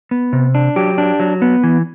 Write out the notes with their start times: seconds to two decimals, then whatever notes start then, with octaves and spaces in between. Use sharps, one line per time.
0.11 B3
0.33 C3
0.55 D4
0.76 F#3 G4
0.98 D4
1.20 F#3
1.42 B3
1.63 E3